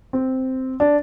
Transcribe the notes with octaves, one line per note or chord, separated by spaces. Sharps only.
C4
D4